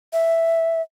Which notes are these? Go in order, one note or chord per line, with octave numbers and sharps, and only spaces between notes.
E5